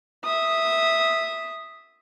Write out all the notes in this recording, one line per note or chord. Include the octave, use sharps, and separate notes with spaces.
E5 D#6